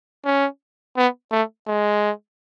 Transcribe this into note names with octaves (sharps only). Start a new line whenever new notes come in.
C#4
B3
A3
G#3